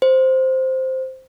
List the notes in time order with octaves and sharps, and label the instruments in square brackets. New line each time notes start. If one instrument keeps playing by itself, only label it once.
[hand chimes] C5